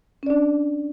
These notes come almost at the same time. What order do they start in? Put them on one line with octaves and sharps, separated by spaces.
C#4 D5 D4